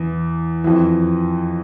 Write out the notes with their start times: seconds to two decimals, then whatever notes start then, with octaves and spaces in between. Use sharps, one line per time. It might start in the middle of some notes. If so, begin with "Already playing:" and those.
Already playing: E2 E3
0.64 F2 E3